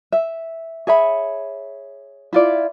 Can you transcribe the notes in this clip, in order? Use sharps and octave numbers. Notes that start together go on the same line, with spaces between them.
E5
G#4 C#5 E5 B5
E4 F4 D5